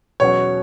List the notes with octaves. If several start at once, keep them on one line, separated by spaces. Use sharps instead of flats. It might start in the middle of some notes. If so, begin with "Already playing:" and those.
E2 B2 F#3 C#4 F#4 C#5